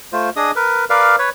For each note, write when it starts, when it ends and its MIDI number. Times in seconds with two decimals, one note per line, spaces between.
0.12 0.30 57
0.12 0.30 65
0.12 0.30 72
0.36 0.52 62
0.36 0.52 68
0.36 0.52 75
0.36 0.52 87
0.56 0.85 70
0.56 0.85 71
0.90 1.16 70
0.90 1.16 71
0.90 1.16 74
0.90 1.16 77
1.19 1.30 71
1.19 1.30 73